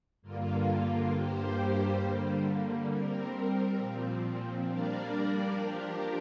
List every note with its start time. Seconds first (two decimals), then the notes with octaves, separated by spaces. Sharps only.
0.22 G2 D3 A#3 F4
1.11 G2 G3 A#3 G4 C5
1.99 D3 G3 A#3
2.87 G3 C4 A#4
3.75 A#2 F3 C4
4.64 G3 A#3 D4 A#4 D5
5.52 F3 D4 G4 A#4